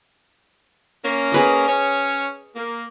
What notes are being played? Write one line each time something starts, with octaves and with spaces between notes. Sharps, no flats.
A#3 C#4
G#4 B4 D#5
C#4 C#5
A#3